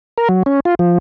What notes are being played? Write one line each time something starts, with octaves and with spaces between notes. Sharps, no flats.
A#4
F#3
C#4
F4
F3